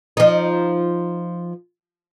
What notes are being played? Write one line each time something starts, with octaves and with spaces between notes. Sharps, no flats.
F3 D#4